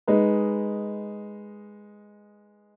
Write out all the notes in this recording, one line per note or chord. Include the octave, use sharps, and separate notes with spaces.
G#3 D#4 B4